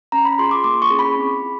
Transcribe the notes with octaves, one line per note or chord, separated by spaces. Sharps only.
C#4 A#5
B5
F4 G#4 C6
D6
A#3 D6
C#6
C#4 E4 G#4
B5
C4
F4 G#4